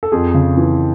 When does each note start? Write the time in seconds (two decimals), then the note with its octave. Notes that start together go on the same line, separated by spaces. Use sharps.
0.03 A4
0.12 F2 G#4
0.35 C#3
0.57 E3